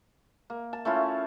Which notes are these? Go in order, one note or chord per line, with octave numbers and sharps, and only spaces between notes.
A#3
A5
A3 C#4 E4 F4